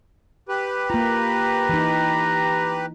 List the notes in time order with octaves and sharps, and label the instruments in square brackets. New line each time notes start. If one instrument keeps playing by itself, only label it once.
[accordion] G4 B4
[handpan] A#3 F4 [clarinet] A#5
[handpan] E3 D#4